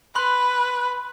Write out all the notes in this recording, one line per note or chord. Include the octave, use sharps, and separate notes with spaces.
B4 B5 C6 F#6